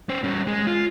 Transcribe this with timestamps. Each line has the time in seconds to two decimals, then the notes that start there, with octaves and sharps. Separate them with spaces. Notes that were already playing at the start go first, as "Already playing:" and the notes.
0.09 C#4 C5
0.24 G3 C#4
0.47 G#3
0.67 F4